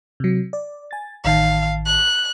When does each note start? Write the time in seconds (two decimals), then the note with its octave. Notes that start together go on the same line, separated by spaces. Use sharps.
0.20 C3 F#3
0.53 D5
0.91 G#5 A6
1.25 A1 D#3 F5 A5
1.86 F#6